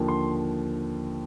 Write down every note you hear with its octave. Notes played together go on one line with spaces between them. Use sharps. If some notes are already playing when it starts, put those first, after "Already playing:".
Already playing: D#2 D3 F3
C6